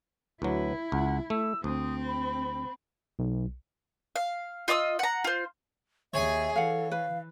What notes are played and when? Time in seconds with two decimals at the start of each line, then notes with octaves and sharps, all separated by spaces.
0.42 D2 F#3 E4 B4
0.92 C#2 F#5
1.30 A3 E6
1.64 D2 C4 D#6
2.07 B5
3.19 B1
4.16 F5
4.68 F4 D#5 D#6 E6
4.99 F#5 A#5
5.24 F4 C5
6.14 D#2 G#4 C#5 E5 G#5
6.56 E3 A4 F5 F#5
6.92 B4 F5